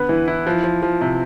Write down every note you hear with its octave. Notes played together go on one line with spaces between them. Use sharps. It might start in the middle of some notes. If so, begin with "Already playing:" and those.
Already playing: D3 B3 B4
E3
E4
F3
F3
F3
C3